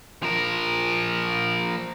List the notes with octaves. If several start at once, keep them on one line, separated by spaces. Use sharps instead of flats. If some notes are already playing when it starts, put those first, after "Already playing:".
F3 A#4